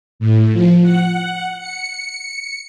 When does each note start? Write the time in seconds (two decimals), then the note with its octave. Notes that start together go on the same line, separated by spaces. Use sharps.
0.19 A2
0.53 F3
0.82 F#5
1.59 C#7